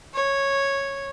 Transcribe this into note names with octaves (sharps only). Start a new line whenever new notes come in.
C#5